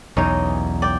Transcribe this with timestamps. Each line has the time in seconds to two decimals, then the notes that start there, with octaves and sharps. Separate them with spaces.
0.17 B1 E2 C#4 D#4
0.82 D5 G5